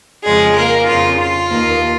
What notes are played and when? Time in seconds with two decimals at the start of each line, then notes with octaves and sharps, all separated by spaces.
0.25 F2 C#3 F3 G#3 G#4
0.57 A#3 A#4
0.88 F2 C#3 F3 F4
1.20 F4
1.50 D#2 D#3 A#3